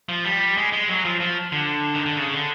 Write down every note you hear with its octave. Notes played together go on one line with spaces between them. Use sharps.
F3
G3
G#3
G#3
F#3
F3
F3
D3
D#3
D3
C#3
D3